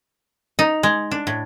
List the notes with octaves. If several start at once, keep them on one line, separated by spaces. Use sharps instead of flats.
D#4
G#3
D4
A2